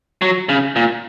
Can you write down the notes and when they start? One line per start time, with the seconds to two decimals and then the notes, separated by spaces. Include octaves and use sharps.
0.22 F#3
0.49 C#3
0.76 A#2